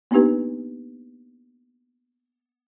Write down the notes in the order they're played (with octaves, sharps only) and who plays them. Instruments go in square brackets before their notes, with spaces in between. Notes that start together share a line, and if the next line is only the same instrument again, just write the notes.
[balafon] A#3 B3 D4 D#4 G4 B4